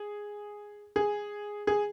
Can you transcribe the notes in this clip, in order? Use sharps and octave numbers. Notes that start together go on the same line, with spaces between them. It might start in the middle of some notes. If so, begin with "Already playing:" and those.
Already playing: G#4
G#4
G#4